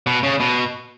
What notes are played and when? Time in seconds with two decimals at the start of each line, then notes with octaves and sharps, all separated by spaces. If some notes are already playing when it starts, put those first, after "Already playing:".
0.07 B2
0.23 C#3
0.40 B2